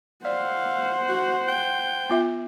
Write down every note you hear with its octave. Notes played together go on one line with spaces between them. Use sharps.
C5 D5 F5 F#5
F#4
G5
B3 F4 E5